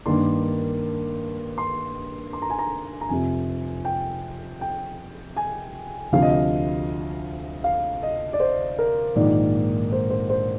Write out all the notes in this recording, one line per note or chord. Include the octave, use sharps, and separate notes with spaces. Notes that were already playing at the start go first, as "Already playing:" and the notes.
G2 D#3 A#3 D4 C6
C6
C6
A#5
G#5
A#5
A#5
F1 F2 C3 G#5
G5
G5
G#5
D2 C3 F3 F5
D#5
F5
F5
D#5
D5
C5
A#4
A#1 G#2 D#3 A#3 D5
C5
C5
C5